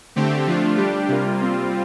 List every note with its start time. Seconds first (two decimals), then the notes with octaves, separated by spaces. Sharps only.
0.16 D3 A3 C4 G4
0.47 F3 A3 D4 F4
0.77 G3 D4 G4
1.08 C3 G3 A#3 F4
1.40 G3 C4 F4